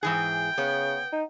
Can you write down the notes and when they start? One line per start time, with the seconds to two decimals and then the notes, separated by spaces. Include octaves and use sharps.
0.03 G#2 E3 G#4 G5
0.58 C#3 B3
1.12 D#4